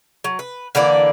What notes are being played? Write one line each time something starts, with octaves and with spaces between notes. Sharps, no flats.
F#3
B4
D3 E3 A#3 D5